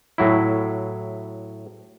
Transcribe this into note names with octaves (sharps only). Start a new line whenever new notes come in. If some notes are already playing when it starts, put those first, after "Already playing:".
A2 F#3 E4